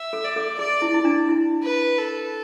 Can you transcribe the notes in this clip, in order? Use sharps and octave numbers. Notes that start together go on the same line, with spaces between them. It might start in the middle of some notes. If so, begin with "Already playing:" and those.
Already playing: E5
A4
D5
A4
G#4 D5
E4
E4
D4
E4
B4
A4